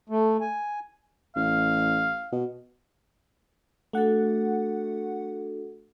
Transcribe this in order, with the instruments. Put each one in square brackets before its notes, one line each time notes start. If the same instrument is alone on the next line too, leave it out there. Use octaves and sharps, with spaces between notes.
[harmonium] A3
G#5
[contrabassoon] A1 [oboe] F5
[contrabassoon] B2
[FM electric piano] A3 F#5 [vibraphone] D4 F#4 A4